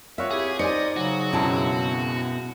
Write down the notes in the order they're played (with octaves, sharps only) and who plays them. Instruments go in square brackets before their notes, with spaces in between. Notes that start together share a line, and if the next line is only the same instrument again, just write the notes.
[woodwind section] C4 A#4 F#5 [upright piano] F4 C#5 [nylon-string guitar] E5
[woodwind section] C4 E4 G4 [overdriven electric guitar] G#4
[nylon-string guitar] D#4 C5 [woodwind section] D5 [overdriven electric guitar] D#5 [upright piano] G#5 C#7
[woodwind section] C#3 F#3 [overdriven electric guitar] F#4
[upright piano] C2 F#2 G#3 [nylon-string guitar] B2 E4 A5